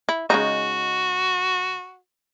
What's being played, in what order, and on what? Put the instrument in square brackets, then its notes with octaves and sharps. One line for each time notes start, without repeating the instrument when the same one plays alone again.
[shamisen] E4
[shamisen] C#3 G#3 D#4 [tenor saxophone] F#4